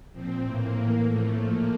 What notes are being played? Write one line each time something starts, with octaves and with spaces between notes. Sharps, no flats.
A#2 F3 C4
A2 E3 A#3
A2 E3
A2 F3 A3
A#2 F3 A#3